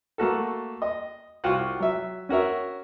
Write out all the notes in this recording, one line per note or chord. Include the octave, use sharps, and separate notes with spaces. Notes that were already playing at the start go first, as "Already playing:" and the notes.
A3 A#3 F#4 A4
D#5
C2 F4 F#4 F#5 F#6
F#3 E5
C#4 F#4 A#4 E5